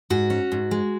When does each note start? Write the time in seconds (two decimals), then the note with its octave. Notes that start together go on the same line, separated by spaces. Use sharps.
0.10 G#2 F#4
0.30 C#4
0.52 G#2
0.71 G#3